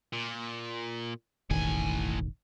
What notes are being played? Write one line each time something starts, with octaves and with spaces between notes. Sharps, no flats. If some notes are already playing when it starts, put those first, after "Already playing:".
A#2
E1 A1 A2 D#3 G#5